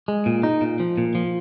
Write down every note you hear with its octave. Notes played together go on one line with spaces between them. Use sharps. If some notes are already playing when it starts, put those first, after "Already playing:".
G#3
A#2
D#4
A#2
F3
A#2
F3